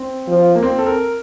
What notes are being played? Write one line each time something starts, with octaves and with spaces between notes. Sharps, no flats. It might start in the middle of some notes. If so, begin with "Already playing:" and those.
Already playing: C4
F3
A#3
C4
A4
A#4